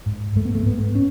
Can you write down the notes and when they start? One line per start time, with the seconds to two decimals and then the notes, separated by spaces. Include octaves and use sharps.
0.06 G#2
0.36 G#2 A3
0.45 B3
0.55 A3
0.66 G#2 B3
0.95 C#4